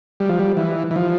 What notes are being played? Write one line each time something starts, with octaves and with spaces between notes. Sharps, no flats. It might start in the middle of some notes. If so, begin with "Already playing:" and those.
G3
F3
G3
E3
E3
F3